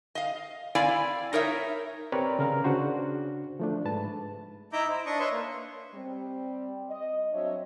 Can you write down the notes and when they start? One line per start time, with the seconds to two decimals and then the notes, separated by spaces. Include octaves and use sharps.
0.15 D#5 F5
0.75 C4 E4 D5 F5 G#5
1.33 D#4 A#4 C#5 E5
2.12 C4 G4 A#4 B4 C#5 D5
2.39 C#3 A#4 F5
2.64 C#3 D4 F#4 C5
3.59 F3 A3 D4
3.85 G#2 B4 A5
4.73 D#4 E4 E5 A#5 D6 G6
4.89 C5
5.06 D4 D#5 C#6 D#6
5.19 B4 C#5 E5 C6 C#6
5.32 A#3
5.94 G3 C4
6.90 D#5
7.32 F#3 C4 D4 C#5 D#5 E5